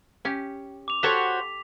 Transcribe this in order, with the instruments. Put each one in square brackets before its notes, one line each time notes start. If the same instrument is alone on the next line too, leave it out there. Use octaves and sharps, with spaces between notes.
[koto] C#4 G4
[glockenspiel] D6 F7
[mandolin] F#4 C5 C#5 [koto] G4 A4 [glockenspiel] B6